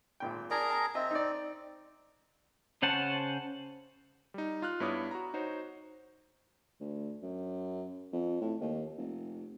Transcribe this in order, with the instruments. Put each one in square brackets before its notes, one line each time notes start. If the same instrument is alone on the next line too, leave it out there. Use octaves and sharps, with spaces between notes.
[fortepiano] G#1 A#2 G5
[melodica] G#4 A#4 A#5 [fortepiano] D5 A5
[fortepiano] A5
[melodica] C4 [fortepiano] D#5 E5
[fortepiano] D#4 D5
[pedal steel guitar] C#3 C#4 C5 F#5 A5
[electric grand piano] G3 D#4
F4 F6 F#6
G2 B3 E4 C#5 D6 D#6
F#4 A#5
D#4 F#4 C5 C#5
[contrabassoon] D2
F#2
F2
A2
D#2
F1